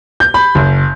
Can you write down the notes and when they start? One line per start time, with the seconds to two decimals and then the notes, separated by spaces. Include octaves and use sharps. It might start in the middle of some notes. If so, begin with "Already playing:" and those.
0.20 G6
0.34 B5
0.55 F#1